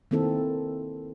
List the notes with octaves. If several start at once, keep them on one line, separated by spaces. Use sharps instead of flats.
D#3 A#3 C4 E4 A4